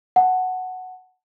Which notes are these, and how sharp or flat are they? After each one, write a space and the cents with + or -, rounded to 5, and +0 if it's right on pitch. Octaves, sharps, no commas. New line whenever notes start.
F#5 +0 A5 +0